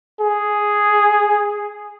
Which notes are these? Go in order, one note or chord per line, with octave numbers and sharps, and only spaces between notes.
G#4